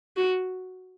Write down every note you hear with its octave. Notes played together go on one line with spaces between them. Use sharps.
F#4